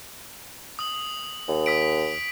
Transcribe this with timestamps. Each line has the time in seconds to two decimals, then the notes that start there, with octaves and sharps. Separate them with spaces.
0.79 D#6 F#7
1.48 D#2
1.66 D#6 B6 D7